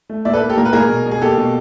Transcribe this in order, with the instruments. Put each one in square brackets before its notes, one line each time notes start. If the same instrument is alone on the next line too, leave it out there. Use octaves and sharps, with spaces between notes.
[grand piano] A3
A#2 D5 E5
A4 B4
A#3
G4 A4
A#2 A#4
B4
A#2 G#4 A#4
B2
B2
G#4
A#3 G4 A4
B2